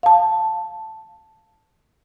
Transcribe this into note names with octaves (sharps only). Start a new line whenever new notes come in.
F5 A5